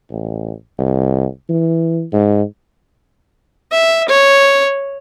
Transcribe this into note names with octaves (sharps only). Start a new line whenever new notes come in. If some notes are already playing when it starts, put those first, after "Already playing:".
A1
C2
E3
G#2
E5
C#5